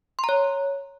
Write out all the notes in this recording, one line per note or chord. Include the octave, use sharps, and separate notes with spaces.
C6
A#5
C#5